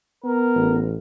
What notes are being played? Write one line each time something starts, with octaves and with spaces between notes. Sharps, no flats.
B3 A#4
A1